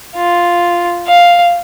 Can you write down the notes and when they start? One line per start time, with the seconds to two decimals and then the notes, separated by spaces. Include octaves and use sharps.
0.16 F4
1.07 F5